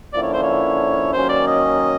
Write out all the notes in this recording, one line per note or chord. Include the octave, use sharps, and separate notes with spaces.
D3 F3 A#3 C#4 E4 D5
C#5
C5
C#5
D#3 F#3 A#3 C#4 C5
D5
D#5